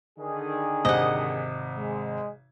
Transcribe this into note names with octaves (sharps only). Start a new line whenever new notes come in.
D3 D#3 G#4
G#1 C3 D#5 F#5
G#3